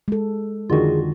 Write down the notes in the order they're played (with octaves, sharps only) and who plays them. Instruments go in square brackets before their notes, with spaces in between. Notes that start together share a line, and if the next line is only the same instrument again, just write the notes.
[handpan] G#3 A4
[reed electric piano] F2 D3 D#3 [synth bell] F4 F#4 [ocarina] G#4